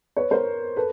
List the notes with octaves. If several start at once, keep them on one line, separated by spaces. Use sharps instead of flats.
B4 C#5
A#4 C5
A4 B4